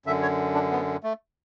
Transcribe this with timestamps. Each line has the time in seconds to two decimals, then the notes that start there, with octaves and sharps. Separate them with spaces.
0.06 F#2 D3 E5
0.22 C#5
0.55 D4
0.71 B3
1.03 A3